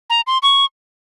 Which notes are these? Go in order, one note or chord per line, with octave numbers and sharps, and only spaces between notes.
A#5
C6
C#6